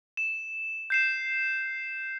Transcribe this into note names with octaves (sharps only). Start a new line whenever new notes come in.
E7
G6 C7 E7